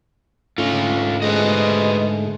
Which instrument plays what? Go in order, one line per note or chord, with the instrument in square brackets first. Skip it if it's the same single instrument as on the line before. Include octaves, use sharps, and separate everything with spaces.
[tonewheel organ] G#2 D3 A3 [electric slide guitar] C#4 F4
[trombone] G#3 [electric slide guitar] B4 C5 D#5